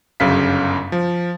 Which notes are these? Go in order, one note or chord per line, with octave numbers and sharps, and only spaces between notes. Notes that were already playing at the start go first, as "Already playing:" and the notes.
G1 F#2 C#3 F5 B6
F3